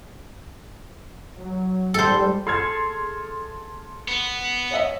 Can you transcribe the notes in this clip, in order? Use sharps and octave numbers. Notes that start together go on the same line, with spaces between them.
F#3
G#2 G3 A4 C5
G#4 A4 C6 F6 G#6
B3
C#5 D#5 E5